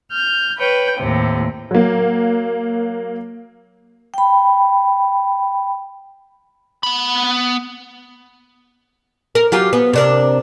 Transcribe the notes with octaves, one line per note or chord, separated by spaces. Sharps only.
F6 G6
B4 C#5 G5
D#2 A2 C3
F#3 A#3
G5 B5
B3 B5
A#4
F#3 F4 G4
B3
C3 D4 A#4